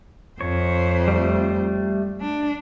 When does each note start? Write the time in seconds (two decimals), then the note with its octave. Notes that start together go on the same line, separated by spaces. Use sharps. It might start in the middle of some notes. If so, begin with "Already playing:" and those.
0.41 F2 C5 C#5
1.08 G3 A3
2.21 D4